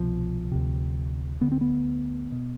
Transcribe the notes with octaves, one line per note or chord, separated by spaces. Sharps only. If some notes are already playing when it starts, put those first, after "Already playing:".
Already playing: C2 B2 F3
D2 C3
D2 D3 B3
C4
B3
B2